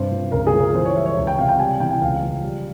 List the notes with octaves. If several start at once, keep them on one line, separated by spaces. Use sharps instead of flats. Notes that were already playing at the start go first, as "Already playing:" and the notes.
Already playing: G2 C3 C5
F3
C#2 A#4
G#4
F3
A#4
E3 C5
C#5
G3 E5
C#5
C#2
G5
C3 F5
G5
G3 G#5
E3 G5
G5
C#2 F5
F3
G3